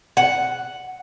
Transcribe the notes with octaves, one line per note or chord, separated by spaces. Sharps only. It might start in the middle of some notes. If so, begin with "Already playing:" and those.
F#5